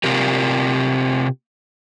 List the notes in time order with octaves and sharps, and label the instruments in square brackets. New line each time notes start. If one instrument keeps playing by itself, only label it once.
[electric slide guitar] C3 C4 F4 G4 A#4